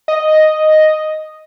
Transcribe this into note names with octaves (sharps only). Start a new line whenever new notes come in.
D#5